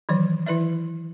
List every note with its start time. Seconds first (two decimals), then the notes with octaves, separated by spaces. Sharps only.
0.09 D#3 E3 F#3 D5
0.46 E3 E4 B4 D5 E5